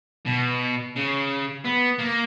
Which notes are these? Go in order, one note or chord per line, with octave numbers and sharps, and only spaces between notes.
B2
C#3
B3
A#3